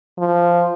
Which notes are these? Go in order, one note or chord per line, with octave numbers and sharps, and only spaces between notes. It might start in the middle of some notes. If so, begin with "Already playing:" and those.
F3